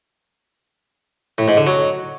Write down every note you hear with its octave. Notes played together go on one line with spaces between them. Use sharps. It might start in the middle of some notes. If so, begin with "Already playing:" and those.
A2
G#2
D3
F#3